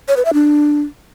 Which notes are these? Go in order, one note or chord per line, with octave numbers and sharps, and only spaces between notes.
C#5
B4
E5
D4